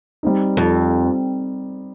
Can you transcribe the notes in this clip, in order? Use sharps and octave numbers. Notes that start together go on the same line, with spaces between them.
G3 C4 D#4
F2